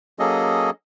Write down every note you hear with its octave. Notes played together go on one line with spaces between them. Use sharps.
F#3 A#3 C#4 G#4 A4 D#5